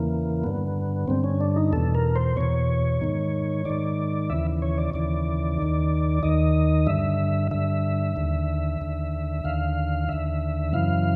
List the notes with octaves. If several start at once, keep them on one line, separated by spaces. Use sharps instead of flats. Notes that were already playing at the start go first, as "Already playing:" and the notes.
Already playing: E2 C#3 E3 A#3
G2 D3 B3
G2 D3 C4
C#4
D4
D#4
E2 B2 A4
A#4
C5
E2 B2 C#5
G#2 D#3
G#2 D#3 D5
D#2 C#3 E3 E5
C#5
D5
D#2 C#3 E3 D5
D#2 D#3
D#2 D#3 D#5
G2 D3 E5
G2 D3 E5
D#2 D3
D#2 D3
D#2 D3 F5
D#2 D3 E5
F#2 C#3 E3 F5